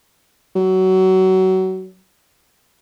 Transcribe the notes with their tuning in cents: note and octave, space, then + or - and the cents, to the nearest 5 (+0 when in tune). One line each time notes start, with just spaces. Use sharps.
F#3 +25